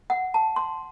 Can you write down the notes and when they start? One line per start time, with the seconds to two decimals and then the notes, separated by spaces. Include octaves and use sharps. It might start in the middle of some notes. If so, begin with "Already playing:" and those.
0.10 F#5
0.34 A5
0.56 C6